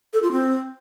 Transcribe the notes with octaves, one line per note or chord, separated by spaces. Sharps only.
A4
F4
C4